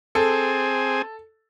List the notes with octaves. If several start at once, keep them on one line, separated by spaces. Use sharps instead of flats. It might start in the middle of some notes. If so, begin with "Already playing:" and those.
C4 G#4 A4